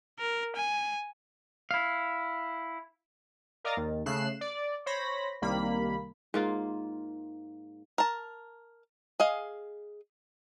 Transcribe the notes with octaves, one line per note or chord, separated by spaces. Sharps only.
A#4
G#5
E4 F5
A#4 D5 D#5 F5 A#5 A6
D#2 D#3
C#3 A3 F#6 C7 E7
D5
C5 C#5 B5 A#6
C2 D#3 G3 A#3 B5
G#2 A#3 F4
A#4 A5
G#4 D#5 F5